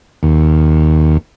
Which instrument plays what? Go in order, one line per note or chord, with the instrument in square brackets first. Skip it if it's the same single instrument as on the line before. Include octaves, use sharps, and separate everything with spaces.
[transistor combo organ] D#2